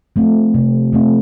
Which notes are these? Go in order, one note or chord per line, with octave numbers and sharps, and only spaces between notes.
F3 A3 C4
C3
F3 A3 C4